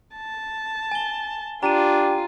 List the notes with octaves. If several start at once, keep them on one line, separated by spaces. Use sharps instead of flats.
A5
G#5 G7
D4 F4 G4 A#5 D#7